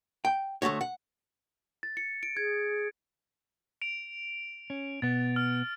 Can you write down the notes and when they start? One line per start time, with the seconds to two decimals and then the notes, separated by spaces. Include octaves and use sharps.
0.25 G5
0.62 D2 G2 A3 F#4 C#5
0.81 F#5
1.83 A6
1.97 C#7
2.23 D7
2.37 G#4 G#6
3.82 D7 F7
4.70 C#4
5.02 B2 B3 A6
5.36 F6